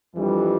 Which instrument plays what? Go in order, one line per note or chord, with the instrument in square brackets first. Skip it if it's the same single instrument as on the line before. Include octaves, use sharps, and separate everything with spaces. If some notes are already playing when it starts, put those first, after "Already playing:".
[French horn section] F2 E3 G3 D4